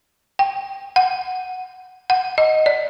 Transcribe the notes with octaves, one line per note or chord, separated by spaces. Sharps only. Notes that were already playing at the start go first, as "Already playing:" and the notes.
G5
F#5
F#5
D#5
D5